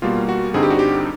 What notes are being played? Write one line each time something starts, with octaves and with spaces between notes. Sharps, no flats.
B2 G3 A#3 F4
F#4
G2 D3 G3 C4 D#4 G#4
G4
F#4
G4